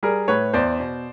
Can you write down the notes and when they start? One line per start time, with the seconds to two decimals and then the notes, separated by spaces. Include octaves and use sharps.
0.03 G3 G#4 A#4
0.28 A2 B4 C#5
0.54 E2 C5 D5
0.80 B2